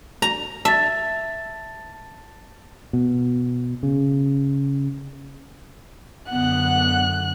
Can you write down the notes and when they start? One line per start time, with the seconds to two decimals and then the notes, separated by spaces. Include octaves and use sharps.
0.22 A#5
0.65 E5 A5 A6
2.93 B2
3.83 C#3
6.31 F#2 D3 B3 F#5 F#6